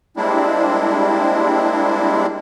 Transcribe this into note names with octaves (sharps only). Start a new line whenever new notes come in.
G3 G#3 A#3 C4 D4 E4